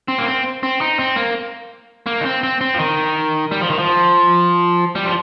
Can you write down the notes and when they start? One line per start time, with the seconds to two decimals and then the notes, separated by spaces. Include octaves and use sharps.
0.08 C4
0.19 A#3
0.26 C4
0.63 C4
0.81 D#4
0.99 C4
1.16 A#3
2.06 A#3
2.21 D#4
2.25 C4
2.43 C4
2.61 C4
2.74 F3
2.79 D#3
3.51 G3
3.61 F3
3.70 D#3
3.79 F3
4.95 G3
5.06 F3